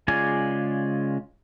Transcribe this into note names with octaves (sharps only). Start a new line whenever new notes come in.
C#3 G#3 F4 D5 G#5